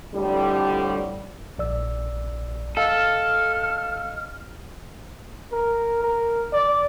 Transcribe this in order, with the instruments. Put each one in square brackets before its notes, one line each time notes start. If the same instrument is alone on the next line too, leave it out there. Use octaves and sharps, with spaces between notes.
[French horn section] F2 A2 D3 G3
[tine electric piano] A#1 D5 E6
[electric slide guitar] A4 [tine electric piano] D#5 F5 E6 [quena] F6
[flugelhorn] A#4
A#4
D5